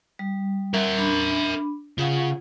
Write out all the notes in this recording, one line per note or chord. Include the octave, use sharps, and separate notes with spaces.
G3
A#4 E5
D4 B5
C#3 F4 F5 F#5